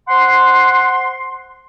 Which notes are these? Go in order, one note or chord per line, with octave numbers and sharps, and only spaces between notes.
C5 F#5 C6